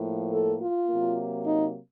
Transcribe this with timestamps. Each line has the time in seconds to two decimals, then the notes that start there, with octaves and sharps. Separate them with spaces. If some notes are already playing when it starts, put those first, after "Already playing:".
Already playing: A2 F3 A#3
0.32 A4
0.60 F4
0.88 C3 F#3 A#3
1.44 D#4